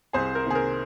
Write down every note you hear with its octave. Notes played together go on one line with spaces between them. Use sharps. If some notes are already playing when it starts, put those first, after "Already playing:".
C2 G#4 C5
A#4
C3 D#3 A#3 G#4
A#4